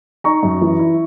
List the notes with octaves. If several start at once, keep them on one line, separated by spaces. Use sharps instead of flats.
D#4 A#5 C#6
F#2
E3
E4